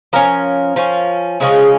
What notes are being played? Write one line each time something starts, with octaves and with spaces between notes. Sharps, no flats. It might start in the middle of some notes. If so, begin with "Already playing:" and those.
F3 C#4 A#4
F3 C#4
C#3 F3 G#3 C#4 G#4